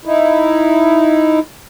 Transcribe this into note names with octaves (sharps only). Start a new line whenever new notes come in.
D#4 E4